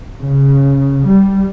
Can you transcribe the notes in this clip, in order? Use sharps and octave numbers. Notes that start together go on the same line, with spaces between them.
C#3
G3